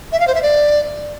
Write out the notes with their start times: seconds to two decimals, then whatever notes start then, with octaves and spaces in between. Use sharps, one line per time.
0.12 E5
0.20 F5
0.27 C5
0.35 E5
0.42 D5